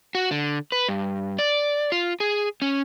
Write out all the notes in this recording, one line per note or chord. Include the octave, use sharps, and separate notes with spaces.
F#4
D3
B4
G2
D5
F4
G#4
C#4